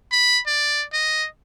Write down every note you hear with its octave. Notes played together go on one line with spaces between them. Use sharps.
B5
D5
D#5